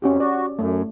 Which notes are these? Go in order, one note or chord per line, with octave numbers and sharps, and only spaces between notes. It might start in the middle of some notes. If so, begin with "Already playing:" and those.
F2 C#4 F#4 G4
F#4 D5
F#2 A3